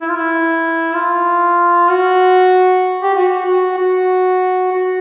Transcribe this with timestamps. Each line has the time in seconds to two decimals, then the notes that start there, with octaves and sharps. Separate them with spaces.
0.01 E4
0.09 F4
0.16 E4
0.95 F4
1.89 F#4
3.03 G4
3.15 F#4
3.46 F#4
3.77 F#4
4.72 F#4